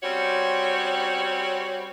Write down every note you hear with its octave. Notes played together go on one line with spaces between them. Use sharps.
G3 C4 C#4 F#4 C5 C#5